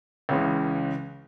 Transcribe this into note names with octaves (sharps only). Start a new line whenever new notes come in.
C#2 C#3 E3 G#3